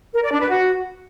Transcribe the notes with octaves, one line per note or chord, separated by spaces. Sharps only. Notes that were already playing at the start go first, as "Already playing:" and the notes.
A#4
D5
D4
B4
F#4